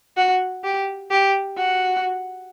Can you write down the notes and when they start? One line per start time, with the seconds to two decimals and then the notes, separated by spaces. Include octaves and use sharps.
0.17 F#4
0.64 G4
1.11 G4
1.57 F#4